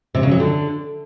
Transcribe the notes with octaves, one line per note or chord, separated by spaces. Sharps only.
C3
C#3
F#3
D3